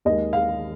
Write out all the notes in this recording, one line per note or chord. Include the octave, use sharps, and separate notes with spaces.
D#2 D#3 G#3 D#5
F5